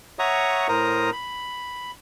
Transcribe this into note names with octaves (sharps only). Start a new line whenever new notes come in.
C#5 E5 F#5 A#5 C#6 D#6
A2 A#4 C5 A#5 D#6
B5